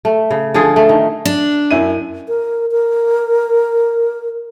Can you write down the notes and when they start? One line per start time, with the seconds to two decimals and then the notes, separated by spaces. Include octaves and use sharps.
0.05 A3
0.31 C#3
0.54 D3 F3 F4 G#4
0.76 A3
0.89 D#3
1.25 D4
1.71 F#2 E4 D#7
2.28 A#4
2.72 A#4